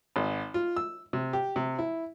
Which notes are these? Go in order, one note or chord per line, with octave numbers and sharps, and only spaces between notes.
G#1
F4
E6
C3
G4
C3
E4